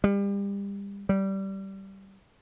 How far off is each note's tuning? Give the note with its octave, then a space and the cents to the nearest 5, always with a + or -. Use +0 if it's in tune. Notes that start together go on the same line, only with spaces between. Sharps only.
G3 +30
G3 -15